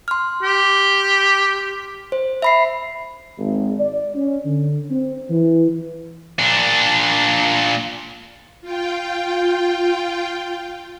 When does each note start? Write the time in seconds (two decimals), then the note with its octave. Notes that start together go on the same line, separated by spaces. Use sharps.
0.08 C6 F6
0.43 G4
2.12 C5
2.42 E5 B5 C7
3.38 G#1
3.80 D5
4.15 C#4
4.45 D3
4.91 C4
5.30 E3
6.39 A#2 D4
8.61 F4 G5